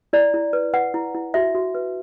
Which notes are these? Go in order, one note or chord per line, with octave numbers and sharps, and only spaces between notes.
E4 D5
E4
B4
B4 F#5
E4
E4
F#4 E5
F#4
B4